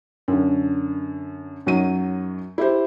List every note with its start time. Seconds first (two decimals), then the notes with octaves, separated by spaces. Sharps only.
0.28 F#2 D3
1.66 F#2 F#3 D#4 D#7
2.58 E4 G4 C5